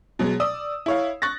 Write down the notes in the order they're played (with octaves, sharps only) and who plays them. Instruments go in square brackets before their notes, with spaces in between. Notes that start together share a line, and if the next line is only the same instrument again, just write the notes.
[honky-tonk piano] B2 F#3 G#3
D5 D#6 E6
E4 C#5 F5
C#6 F#6 A6 A#6